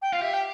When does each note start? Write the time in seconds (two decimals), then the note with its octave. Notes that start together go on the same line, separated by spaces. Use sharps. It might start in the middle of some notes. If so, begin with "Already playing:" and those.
0.01 G5
0.12 F4 F5
0.22 G4 E5
0.33 G5